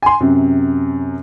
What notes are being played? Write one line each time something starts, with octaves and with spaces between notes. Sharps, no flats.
G#5 C6
F#2 C3